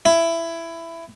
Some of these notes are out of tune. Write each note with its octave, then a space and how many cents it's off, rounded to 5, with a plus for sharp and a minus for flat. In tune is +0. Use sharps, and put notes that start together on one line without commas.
E4 +15